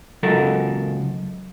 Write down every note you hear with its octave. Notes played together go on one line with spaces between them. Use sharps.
C#2 F#3 A4 A#4